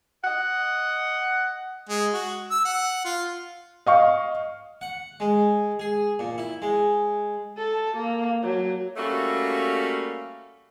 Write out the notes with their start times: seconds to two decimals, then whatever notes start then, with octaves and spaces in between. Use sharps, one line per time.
0.24 D#5 F#5
1.90 G#3
2.14 F#4
2.51 E6
2.65 F#5
3.05 F4
3.86 D#5 F5 C#6
4.81 F#5
5.20 G#3
5.80 G#4
6.19 A#2
6.38 E4
6.62 G#3
7.57 A4
7.97 A#3
8.42 F#3
8.97 G3 A3 A#3 C#4 F#4